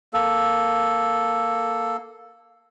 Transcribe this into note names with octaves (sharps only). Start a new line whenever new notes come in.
A#3 A4